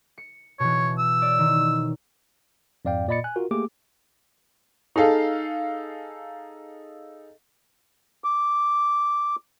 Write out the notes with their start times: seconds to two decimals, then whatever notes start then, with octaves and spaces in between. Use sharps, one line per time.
0.18 C#7
0.60 B2 E3 C#5
0.99 E6
1.22 C#5 D5
1.39 D#3
2.85 F2 G#2 D5 F5 G5
3.08 A#2 D5 D#5 B5 A6 C#7
3.24 G#5 F#6
3.36 F4 F#4 A#4
3.51 A3 A#3 G4 G#4 D6
4.96 D#4 G#4 A4 F5
8.24 D6